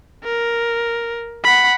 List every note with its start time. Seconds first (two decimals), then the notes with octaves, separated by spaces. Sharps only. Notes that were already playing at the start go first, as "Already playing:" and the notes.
0.24 A#4
1.44 F#5 B5